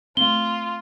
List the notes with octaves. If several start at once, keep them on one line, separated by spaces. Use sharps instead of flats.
A3 C4 F4 G7